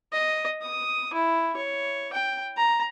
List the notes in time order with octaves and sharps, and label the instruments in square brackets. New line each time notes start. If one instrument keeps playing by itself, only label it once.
[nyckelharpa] D#5
D#6
E4
C#5
G5
A#5